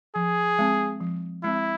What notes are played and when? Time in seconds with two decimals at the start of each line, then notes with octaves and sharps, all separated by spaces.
0.15 F3 G#4
0.59 G#3 C4
1.01 F3
1.43 G#3 C4 E4